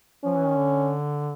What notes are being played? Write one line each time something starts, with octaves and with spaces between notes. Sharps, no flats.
F3 C#4
E3
D#3
D3